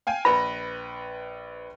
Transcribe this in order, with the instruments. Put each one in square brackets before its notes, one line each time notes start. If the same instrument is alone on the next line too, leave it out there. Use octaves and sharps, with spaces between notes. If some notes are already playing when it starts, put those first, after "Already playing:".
[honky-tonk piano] F5 G5 G#5
[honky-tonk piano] A#1 B4 A#6 [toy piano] B5